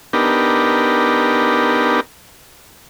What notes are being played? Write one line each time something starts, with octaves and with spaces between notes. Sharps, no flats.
B3 D4 D#4 G4 A#4